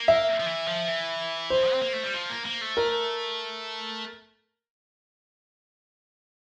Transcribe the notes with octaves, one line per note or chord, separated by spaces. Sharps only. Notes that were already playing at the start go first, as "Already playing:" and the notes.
Already playing: A#3
E5
F3
E3
F3
E3
C5
C4
A#3
A3
G3
F3
A#3
A#3
A3
A#4